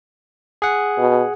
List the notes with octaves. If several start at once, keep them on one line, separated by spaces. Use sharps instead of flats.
G#4 F#5
B2